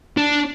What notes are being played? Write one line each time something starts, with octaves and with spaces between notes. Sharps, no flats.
D4